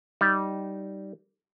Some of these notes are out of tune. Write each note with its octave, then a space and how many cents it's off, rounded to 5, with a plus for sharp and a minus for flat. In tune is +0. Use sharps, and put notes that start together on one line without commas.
G3 -15 D#4 -5